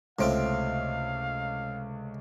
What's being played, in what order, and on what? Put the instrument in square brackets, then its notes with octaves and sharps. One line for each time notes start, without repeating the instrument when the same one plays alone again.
[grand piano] C#2 A3 D7 [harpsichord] A2 C4 F4 [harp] C3 [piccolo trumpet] F5